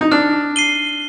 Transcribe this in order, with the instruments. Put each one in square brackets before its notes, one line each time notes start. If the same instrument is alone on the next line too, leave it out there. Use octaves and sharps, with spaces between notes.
[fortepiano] D#4
[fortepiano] D4 [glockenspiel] F6
[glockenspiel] C7 D#7 G7